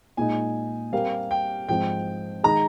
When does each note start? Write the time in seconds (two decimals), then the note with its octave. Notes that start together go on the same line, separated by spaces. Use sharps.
0.17 A#2 G#3 D#4 G#5
0.93 G3 C4 G4 A#4 F5
1.31 G5
1.68 G#2 F3 G#3 C4 G5
2.43 D#3 G#3 D#4 G#4 A#5